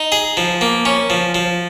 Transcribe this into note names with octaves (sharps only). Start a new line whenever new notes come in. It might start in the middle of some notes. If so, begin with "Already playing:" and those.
Already playing: D#4
G#4
F3
A#3
C#4
F3
F3